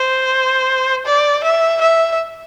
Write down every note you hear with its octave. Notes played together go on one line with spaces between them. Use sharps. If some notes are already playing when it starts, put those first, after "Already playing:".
Already playing: C5
D5
E5
E5